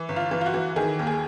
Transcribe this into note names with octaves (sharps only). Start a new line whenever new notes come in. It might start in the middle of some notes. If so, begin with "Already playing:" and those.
Already playing: E3
G1
F4
E3
F4
F#4
E3
D#3 G#4
D#2
G#4